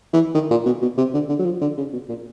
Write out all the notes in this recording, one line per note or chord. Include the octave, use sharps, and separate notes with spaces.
E3
D#3
A#2
B2
B2
C3
D3
D3
F#3
F3
D3
C#3
B2
A#2